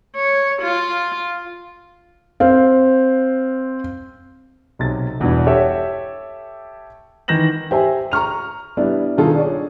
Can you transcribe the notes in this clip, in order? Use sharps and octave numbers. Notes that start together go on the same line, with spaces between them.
C#5
F4
C4 F5
B1 C3 A6
E1 E2 G2 B2 E3
G4 A4 C#5 E5
D#3 E3 G6 A#6 E7 F#7
G4 C5 E5 G#5
A#5 C#6 F6 F7
G3 B3 D4 E4
G2 B2 D#3 F4 G#4 A4
D4 G#4 C#5 D5